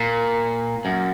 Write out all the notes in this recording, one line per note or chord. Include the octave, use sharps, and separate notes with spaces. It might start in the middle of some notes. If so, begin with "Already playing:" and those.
Already playing: A#2
F#2